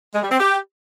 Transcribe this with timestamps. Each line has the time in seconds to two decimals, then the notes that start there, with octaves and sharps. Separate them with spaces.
0.15 G#3
0.23 G3
0.31 C4
0.40 G4